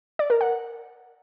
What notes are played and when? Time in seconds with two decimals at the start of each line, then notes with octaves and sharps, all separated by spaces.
0.19 D5
0.30 A#4
0.41 F#5